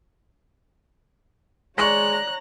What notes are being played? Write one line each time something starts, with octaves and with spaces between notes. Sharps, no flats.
G#3 C#5 D5 A#5 C#6 F#6 A#6